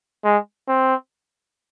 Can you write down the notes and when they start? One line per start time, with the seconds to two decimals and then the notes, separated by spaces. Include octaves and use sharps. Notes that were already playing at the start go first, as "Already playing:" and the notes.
0.24 G#3
0.68 C4